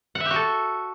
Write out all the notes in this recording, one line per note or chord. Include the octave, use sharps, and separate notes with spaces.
F#5
E5
G4
F#4
A4